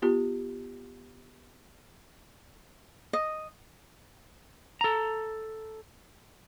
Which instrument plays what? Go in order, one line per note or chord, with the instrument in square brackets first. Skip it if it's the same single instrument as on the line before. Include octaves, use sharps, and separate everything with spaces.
[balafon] B3 F4 G4
[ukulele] D#5
[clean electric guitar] A4 A#5